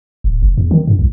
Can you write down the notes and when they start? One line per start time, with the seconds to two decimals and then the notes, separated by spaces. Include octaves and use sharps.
0.24 D1
0.42 F1
0.58 E2
0.71 D#3
0.87 G2
0.99 C2